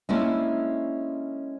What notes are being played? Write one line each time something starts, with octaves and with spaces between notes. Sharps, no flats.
G#3 A#3 C#4 D4 E4 A4